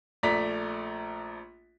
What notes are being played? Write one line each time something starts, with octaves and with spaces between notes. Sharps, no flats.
A#1 A3 D5 A#5 B6